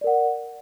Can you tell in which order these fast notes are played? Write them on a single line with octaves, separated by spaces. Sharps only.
D5 A#4 F#5